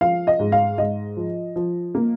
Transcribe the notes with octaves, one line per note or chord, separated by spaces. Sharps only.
F3 F5
D#5
G#2
F5
G#2 D#5
F3
F3
A#3